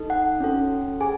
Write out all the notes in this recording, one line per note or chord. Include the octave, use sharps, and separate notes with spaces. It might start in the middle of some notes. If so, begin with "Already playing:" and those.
Already playing: D#4 A4
F#5
C#4 F#4 A4
G#4 G#5